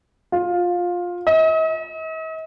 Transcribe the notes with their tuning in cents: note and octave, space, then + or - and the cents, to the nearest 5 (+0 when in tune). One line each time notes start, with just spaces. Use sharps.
F4 +15
D#5 +45